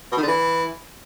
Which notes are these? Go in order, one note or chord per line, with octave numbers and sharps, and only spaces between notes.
B2
D#3
D3
E3